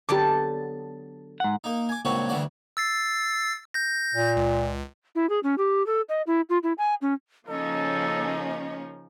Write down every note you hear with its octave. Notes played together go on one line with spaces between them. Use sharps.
D3 F#3 B3 G4 A5 D6
G#2 F#5
A#3 D#4
G#5 D6
C#2 G2 A#2 C4 F#4 C#5
D2 G2 E3 F#4 D5
E6 A6 C7
G6 A#6
A#2
C#2
E4
G#4
C#4
G4
A4
D#5
E4
F4
E4
G#5
C#4
C#3 F3 A#3 C#4 D#4 A4 D#5